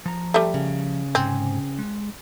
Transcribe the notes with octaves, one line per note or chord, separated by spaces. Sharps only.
F3 A#5
G3 A3
C#3
G#2 C3 C4 G#5
G#3